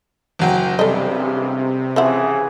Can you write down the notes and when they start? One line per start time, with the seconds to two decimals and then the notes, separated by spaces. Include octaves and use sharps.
0.39 F#1 F#3 G5
0.79 A1 G2 C3 G3 G#3 A4 D#5
1.96 C#3 E3 F3 G#4 E5 F#5